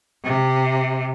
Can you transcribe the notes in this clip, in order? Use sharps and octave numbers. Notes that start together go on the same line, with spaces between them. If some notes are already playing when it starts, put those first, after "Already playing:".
C3